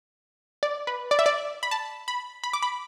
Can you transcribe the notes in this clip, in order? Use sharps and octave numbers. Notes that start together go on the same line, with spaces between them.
D5
B4
D5
E5
D5
B5
A5
B5
B5
D6
B5